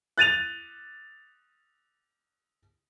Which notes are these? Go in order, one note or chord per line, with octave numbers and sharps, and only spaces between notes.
F#6 A6 D#7 F7